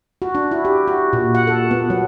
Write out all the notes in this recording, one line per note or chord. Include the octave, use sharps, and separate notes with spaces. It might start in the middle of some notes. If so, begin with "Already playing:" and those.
F#4
D4
E4
G4
F#4
A#2
F#5
A4
B3
F#3